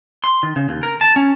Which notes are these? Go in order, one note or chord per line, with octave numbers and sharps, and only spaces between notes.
C6
D#3
C#3
D#2
A#4
A5
C#4